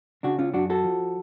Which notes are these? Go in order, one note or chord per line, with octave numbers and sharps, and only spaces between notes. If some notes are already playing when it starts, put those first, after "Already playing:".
C#3 D4 F#4
C#4 F4
F#2 D4 F#4
F#4 A4
F3